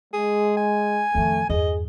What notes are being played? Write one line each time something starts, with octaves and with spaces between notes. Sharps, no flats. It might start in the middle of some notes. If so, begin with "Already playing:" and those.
G#3 G#4
G#5
F2 D#3 A3
E2 G2 G#4 D#5